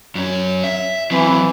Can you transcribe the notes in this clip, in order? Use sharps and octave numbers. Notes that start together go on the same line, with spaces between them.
F#2 C#4
E5
E3 F#3 C4